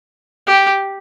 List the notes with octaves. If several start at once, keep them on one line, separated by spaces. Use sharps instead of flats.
G4